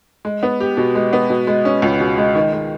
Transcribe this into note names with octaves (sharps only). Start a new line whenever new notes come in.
G#3
B3
G4
B2
G#3
B3
B2
G#3
C#4
C#2
B2
G#3
D#3
G#3